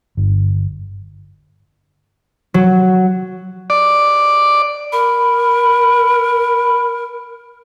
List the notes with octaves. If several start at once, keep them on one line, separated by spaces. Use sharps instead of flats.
G1
F#3
D5
A#4 B5